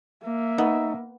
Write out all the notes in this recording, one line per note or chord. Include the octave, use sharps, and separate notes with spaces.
A#3 E5
B3 D#4